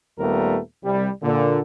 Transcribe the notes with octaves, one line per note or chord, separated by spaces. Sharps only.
D#2 A#2 G3 A3 B3 A#4
C2 G3
A#2 D3